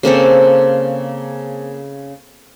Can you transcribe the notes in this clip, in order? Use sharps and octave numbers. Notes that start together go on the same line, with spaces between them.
C#3 A#3 C4 A4